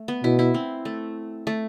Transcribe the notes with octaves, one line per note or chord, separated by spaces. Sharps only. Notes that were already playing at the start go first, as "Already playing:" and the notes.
Already playing: A3
B3
B2 E4
E4
C4
A3
A3